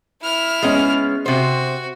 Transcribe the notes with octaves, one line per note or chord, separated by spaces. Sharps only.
E4 F6
G#3 B3 C#4
C3 F#4 C5